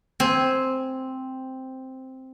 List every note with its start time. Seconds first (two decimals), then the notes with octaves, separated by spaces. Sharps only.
0.20 C4 G#5